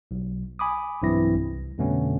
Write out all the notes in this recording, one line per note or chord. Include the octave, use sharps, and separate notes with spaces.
B1
G#5 B5 D6 D#6
B1 G2 E3 C4 E4 A#6
C2
F2 B2 D3 A3 B3 C#4